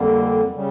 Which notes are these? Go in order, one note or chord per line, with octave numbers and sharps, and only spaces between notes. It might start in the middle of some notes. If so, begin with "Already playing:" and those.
Already playing: F2 D3 G3 A#3
C#3 G3